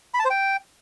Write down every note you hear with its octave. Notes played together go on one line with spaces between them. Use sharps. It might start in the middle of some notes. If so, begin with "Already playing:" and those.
B5
A5
C5
G5